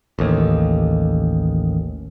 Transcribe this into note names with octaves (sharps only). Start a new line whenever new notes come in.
A1 D#2